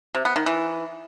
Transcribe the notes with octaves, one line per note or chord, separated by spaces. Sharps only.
C3
B3
D#3
E3